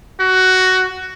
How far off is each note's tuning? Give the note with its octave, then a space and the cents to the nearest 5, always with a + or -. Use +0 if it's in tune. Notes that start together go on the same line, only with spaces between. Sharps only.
F#4 +10